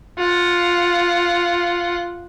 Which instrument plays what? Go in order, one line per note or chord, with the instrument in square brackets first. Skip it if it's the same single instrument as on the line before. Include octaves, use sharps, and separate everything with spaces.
[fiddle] F4 F#5